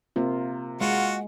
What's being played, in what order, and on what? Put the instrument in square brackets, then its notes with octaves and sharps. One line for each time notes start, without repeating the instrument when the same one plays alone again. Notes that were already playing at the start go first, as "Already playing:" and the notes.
[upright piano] C3 [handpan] A#3 F4
[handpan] G#3 [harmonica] F4 F#4 [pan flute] F#5